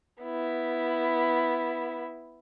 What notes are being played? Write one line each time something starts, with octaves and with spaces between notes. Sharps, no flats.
B3 E4